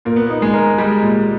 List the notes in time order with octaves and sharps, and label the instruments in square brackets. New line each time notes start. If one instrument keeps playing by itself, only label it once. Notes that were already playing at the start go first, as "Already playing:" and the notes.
[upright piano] A#2 [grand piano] A#3
[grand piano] B3
[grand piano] A#3 [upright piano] D#4
[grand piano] G#3
[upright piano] A#4
[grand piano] G3 [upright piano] G#3
[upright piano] A#2